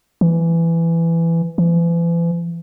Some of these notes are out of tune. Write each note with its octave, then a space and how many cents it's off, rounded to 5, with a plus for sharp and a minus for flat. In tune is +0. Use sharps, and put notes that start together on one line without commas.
E3 +15
E3 +40